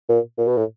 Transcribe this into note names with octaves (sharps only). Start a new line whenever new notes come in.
A#2
A#2
B2
A2